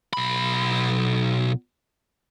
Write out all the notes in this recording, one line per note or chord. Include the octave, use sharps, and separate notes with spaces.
B1 B5